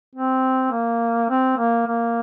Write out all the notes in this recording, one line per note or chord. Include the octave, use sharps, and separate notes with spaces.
C4
A#3
C4
A#3
A#3